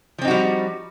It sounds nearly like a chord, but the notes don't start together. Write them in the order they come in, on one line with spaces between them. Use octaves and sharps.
F3 C4 D#4 F#4 G3